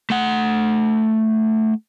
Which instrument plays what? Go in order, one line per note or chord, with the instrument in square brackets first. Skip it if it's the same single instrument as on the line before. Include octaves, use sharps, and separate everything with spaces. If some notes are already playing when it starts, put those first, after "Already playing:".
[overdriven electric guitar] A3 F#5